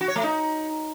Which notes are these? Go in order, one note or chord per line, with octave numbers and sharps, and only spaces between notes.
F#4
C#5
A3
D#4